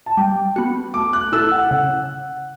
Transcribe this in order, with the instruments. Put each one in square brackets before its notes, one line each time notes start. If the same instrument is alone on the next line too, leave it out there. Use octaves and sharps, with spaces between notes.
[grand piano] A5
[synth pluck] G3 [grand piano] G5
[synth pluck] B3 F#4
[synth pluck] A3 [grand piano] D6
[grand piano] F#6
[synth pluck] E4 A4 [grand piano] E6
[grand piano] F#5
[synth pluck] C#3 [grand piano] F#5